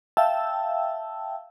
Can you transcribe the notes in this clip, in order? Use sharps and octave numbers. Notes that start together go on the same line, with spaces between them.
E5 F5 G5 A5 E6